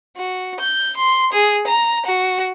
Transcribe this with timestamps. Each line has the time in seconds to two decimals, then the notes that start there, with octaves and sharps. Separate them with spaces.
0.17 F#4
0.60 G6
0.97 C6
1.32 G#4
1.67 A#5
2.06 F#4